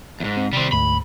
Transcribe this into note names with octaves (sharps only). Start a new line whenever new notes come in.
E2 G#2
C4
C3 D#3 G3 C4
D2 G#2 B5